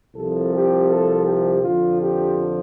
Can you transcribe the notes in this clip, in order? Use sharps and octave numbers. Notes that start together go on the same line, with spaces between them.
C2 C3 F3 A4
G4
A4
G4
F2 D3 F3 F4
G4